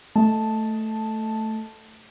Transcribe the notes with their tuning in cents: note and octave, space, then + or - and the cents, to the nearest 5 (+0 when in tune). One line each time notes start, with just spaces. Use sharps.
A3 +0 D#5 +15 A5 +0